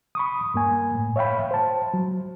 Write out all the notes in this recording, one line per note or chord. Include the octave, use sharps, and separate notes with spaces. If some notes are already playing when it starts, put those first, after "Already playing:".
B5 C#6 D#6
G2 A#3 G#5
A2
C#5 E5 F5 G5 B5
C5 A5
F#3